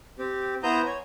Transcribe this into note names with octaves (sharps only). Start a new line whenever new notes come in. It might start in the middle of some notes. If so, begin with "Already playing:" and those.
C4 G4
B3 E4 C5 A#5 D#6 G6
C#5 G#5